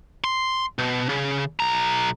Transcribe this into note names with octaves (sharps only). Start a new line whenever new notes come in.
C6
B2
C#3
B1 A#5